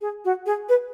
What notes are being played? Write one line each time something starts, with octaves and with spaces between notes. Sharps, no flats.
G#4
F#4
G#4
B4